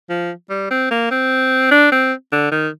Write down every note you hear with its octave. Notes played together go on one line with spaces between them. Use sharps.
F3
G3
C4
A#3
C4
D4
C4
D3
D#3